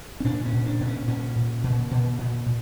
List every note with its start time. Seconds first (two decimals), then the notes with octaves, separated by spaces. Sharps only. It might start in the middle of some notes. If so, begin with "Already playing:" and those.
0.20 C#4
0.24 A#2 D4
0.46 C#4
0.53 A#2
0.66 D4
0.80 A#2
0.87 C#4
1.08 A#2 C#4
1.36 A#2
1.64 A#2
1.91 A#2
2.18 A#2
2.46 A#2